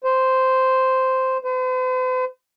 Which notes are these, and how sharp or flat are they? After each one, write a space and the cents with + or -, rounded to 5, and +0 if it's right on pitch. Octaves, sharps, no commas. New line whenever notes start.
C5 -5
C5 -45